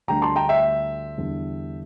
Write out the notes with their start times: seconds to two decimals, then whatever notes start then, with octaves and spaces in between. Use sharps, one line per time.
0.08 D2 D3 G3 G5 A#5
0.22 A5 C6
0.36 G5 A#5
0.49 E5 G5
1.17 E2 D3 G3